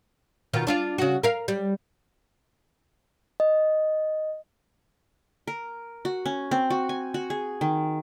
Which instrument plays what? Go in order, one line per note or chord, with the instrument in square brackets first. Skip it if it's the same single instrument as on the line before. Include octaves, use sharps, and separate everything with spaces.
[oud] B2 D#3 F4
D4 F4 F5
C#3 F#4
A#4 F5
G3
[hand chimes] D#5
[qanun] A#4
F#4
C#4
C4
F#4
G#5
F#4
G#4
D#3